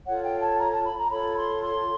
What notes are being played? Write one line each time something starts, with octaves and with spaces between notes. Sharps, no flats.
F4 A4 C#5 F#5
G5
A5
A#5
A5
B5
A#5
F4 A4 C#5 B5
C6
C6